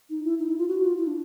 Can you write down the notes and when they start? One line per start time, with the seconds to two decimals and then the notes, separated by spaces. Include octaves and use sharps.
0.10 D#4
0.24 E4
0.39 D#4
0.49 E4
0.58 F4
0.68 F#4
0.83 F4
0.98 E4
1.07 D4